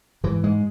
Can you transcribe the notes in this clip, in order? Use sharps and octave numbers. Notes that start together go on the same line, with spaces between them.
G#2 E3
G#2 G#3